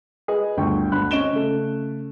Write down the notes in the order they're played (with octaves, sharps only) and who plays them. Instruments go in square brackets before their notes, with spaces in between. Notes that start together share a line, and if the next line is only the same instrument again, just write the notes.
[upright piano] G#4 B4 D#5 G#5
G1 D2 G5 C#6
D2 B5 F#6
C4 C#4 D#5 D7 E7 G7
C#3 A3